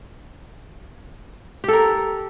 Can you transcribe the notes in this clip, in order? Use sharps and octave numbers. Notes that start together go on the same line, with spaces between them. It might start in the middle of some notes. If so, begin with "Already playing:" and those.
G4 A4 A#4